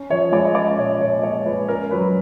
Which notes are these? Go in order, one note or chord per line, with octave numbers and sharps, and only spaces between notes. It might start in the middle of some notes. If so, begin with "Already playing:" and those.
Already playing: C#4
F3 C#5
G#3 D5
D#5
C#4 D5
A#2 C#5
A#2 C#5
G#3 C#5
G#3 B4
C#4 A#4
F#3 B4